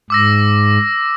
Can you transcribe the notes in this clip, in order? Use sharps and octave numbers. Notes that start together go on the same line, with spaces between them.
G#2 D6 E6 A#6